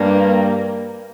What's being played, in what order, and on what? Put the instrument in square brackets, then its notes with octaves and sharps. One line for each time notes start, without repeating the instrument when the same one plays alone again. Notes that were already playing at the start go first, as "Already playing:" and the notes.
Already playing: [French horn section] G2 [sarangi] A#3